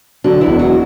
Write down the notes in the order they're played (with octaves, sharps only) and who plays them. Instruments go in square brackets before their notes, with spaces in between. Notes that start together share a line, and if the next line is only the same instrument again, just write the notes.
[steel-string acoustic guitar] D3 D4 [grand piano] F#3
[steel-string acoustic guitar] E3 E4
[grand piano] E1
[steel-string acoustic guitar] F#3 F#4